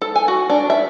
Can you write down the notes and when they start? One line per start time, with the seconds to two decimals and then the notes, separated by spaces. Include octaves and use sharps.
0.02 A4
0.16 G#5
0.28 F#4
0.50 D4
0.70 E5